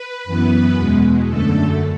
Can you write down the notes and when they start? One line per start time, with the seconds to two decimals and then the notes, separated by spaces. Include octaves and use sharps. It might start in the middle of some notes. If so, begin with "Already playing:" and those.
Already playing: B4
0.24 F#2 E3 B3
0.75 E2 B2 G#3
1.27 F#2 D3 A3 A4